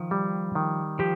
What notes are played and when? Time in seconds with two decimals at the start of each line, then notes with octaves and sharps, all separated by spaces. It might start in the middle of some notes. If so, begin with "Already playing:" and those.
Already playing: D#3 F3
0.11 G3
0.55 D#3
0.99 F3 G4